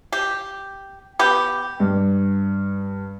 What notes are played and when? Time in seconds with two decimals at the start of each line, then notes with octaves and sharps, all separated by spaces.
0.12 G4
1.19 B3 G4
1.80 G2